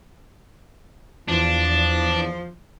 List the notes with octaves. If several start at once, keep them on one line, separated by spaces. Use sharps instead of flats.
E2 F3 D4